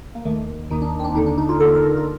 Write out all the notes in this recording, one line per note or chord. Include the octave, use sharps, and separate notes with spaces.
A#3
D#2 D#3 A3
D#2 D#3 D#4
D4
C4
D4
D#2 D3 D#4
D4
D#4
F4
D#2 D3 A4
A#4
F4